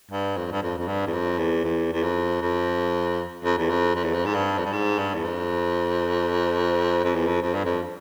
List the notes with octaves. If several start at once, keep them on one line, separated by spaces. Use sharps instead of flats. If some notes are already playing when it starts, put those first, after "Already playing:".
G2
F2
G2
F2
F2
G2
E2
F2
E2
E2
E2
F2
F2
F2
E2
F2
F2
E2
F2
G#2
G2
F2
G2
G#2
G2
E2
F2
F2
E2
F2
F2
G2
F2